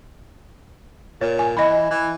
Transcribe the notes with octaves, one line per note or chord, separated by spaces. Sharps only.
A#2 C#5
G#5
E3 D#5 B5
E3